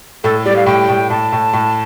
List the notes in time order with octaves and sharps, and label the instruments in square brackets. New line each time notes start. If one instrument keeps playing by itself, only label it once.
[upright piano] A2 [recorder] A4
[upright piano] G3 [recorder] D5
[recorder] F5
[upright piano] A2 [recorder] G5
[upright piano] A2
[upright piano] A2 [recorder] A5
[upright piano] A2
A2